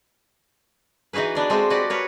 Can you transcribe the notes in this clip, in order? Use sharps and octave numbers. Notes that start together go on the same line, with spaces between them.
E3 D#4 F#4 G#4 B4
B3 D4 D5
G#3 A3 C4 D4 C5
F#4 G4 B4 D5 D#5
A#4 B4 C#5